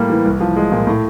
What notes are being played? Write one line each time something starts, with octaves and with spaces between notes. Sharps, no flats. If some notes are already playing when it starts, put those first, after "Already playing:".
Already playing: A2 G3 A#3
E3
C2
F3
G#3
A#2
A2